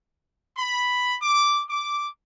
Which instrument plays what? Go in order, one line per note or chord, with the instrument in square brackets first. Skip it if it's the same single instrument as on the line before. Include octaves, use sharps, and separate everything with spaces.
[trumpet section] B5
D6
D6